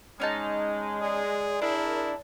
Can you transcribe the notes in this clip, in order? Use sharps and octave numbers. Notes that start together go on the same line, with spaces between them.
G#3 C#4 D#4 A5
G#4 D5
D4 E4 G#4 A#4